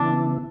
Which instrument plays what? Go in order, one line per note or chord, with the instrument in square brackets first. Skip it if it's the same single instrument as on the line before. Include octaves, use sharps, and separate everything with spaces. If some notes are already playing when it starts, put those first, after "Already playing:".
Already playing: [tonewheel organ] C#3 E3 B3 E4 [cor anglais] D4